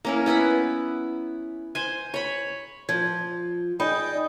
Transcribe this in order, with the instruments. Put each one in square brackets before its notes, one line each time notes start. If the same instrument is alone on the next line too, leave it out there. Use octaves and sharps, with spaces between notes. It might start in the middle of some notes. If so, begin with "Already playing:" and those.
[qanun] A#3 C#4 E4
B3 E4 F#5 B5
C5 G#5
C#5 B5
[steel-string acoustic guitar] F3 [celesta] G#6
[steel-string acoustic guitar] D#4 G#4 D5 [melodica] D#5 G5 [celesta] B5